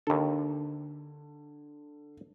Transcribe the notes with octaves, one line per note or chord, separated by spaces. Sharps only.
D#2 D3 A4